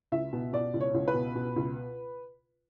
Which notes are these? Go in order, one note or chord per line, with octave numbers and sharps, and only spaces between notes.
C#2 E5
B2
B2 D5
C#2
C#5
C#2
B4
B2
B2
C#2